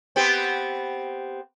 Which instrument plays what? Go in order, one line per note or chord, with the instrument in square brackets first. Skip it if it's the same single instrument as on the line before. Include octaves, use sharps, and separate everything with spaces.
[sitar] B3 C4 G4